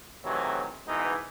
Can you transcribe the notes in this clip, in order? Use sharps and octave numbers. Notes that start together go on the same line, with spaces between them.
A2 C3 D#3 E3 F#3
G#2 B2 D#3 E3 D#4